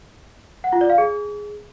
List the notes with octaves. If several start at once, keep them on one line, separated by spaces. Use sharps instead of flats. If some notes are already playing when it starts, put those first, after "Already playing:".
F#5
F4
D5
F5
G#4